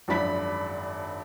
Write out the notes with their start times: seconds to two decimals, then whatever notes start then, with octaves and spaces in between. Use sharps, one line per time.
0.08 G#1 F#2 F3 D4 B5 B6